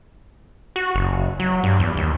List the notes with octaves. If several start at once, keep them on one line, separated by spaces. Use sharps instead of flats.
F#4
F#1
F#3
G2
E2
D#2